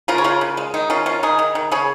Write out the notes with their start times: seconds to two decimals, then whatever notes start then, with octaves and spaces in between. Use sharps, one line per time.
0.08 C#3 F4 A#4
0.18 C#5
0.24 C#3 F4 A#4
0.41 C#3
0.57 G#3
0.74 D#3 D#4
0.90 D#3 C#4 F4
1.06 D#3 C#4 F4
1.23 D#3 D#4 G#4
1.39 D#3
1.55 D#3
1.72 C#3 G#4 C#5